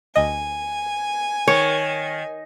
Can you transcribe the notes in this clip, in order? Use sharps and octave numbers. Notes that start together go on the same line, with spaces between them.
D2 D#5 G#5
D#3 C#5